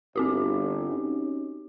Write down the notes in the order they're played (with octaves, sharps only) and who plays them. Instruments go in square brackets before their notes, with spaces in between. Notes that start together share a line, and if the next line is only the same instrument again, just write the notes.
[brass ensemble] G1 [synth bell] C4 F#4 G4
[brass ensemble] C#4 D#4